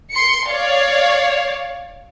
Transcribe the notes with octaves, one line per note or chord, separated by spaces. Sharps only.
C6 C#7
C#5 D5 F5